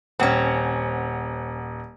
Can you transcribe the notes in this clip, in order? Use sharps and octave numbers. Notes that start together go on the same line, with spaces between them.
D#1 C4 C#4 F#5